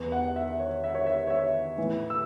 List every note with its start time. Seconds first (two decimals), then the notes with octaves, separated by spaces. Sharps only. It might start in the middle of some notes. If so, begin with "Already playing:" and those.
Already playing: E2 E3
0.12 F#5
0.36 E5
0.60 C#5
0.84 E5
0.95 C#5
1.06 E5
1.27 C#5
1.30 E5
1.78 A2 E3
2.10 E6